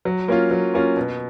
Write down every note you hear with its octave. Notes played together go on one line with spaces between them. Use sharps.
F#3
A#3 C#4 F4
F#3
A#3 C#4 F4
B2